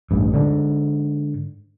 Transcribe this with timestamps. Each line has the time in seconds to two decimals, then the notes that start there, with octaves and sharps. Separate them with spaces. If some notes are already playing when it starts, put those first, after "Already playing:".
0.11 A1 G2
0.34 G#2 D3